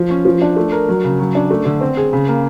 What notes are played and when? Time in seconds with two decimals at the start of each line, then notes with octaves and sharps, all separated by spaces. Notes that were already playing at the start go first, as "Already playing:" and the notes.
Already playing: F3
0.10 C#4
0.25 F3
0.42 D4
0.56 A3
0.72 A#4
0.89 F#3
1.04 C#3
1.19 F#3
1.35 D4
1.50 A3
1.65 D3
1.81 C4
1.97 G#4
2.13 C#3
2.28 A#3